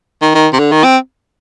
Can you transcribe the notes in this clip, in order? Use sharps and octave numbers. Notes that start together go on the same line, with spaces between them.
D#3
D#3
C3
D3
D#3
C4